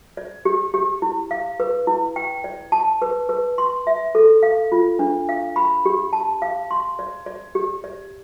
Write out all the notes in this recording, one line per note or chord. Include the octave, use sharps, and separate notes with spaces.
D5
G4
G4
E4
F5
B4
E4
G5
D5
A5
B4
B4
C6
E5
A4
F5
F4
D4
F5
B5
G4
A5
F5
C6
D5
D5
G4
D5